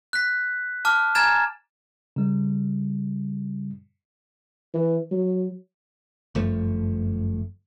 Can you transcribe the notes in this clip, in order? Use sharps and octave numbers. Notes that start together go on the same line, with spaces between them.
F#6 B6
A5 D6 F6
G#5 A#5 F6 G#6 A6 E7
C#3 G3
E3
F#3
G1 F#2 F3 A3